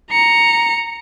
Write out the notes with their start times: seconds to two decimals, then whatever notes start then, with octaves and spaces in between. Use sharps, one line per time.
0.11 A#5 C#7